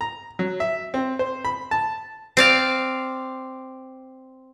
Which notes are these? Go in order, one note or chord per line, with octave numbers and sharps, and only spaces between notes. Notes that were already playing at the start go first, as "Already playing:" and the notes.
A#5
F#3
E5
C4
C5
B5
A5
C4 D5 F5